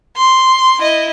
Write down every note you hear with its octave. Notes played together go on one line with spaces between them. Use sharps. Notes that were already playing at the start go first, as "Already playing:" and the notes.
C6
E4 D#5